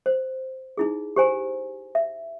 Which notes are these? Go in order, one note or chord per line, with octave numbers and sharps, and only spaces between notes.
C5
D#4 E4 G#4
G4 C5 G#5 A#5
E5